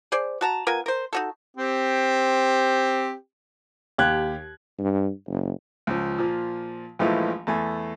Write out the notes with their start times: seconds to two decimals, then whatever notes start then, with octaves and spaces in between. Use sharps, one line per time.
0.12 G#4 C5 D5
0.41 F#4 A5 A#5
0.67 B3 F4 A#4 G#5
0.86 A#4 C5
1.13 D#4 F#4 A4
1.57 C4 G4
3.98 D#2 G4 F#6 G#6
4.78 G2
5.27 F#1
5.87 C#2 F3
6.18 A#2 F3
6.99 A#1 E3 F3 G#3 A3
7.47 E2 A3 G#5